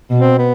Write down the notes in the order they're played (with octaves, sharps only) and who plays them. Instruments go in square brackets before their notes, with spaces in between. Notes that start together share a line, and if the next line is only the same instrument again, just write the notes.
[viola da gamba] B2
[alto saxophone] C4
B3